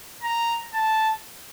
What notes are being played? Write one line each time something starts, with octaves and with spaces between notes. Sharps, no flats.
A#5
A5